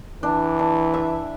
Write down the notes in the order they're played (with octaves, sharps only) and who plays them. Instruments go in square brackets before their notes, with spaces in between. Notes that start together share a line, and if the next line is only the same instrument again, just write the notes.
[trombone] E3 [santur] D4
[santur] D4
E5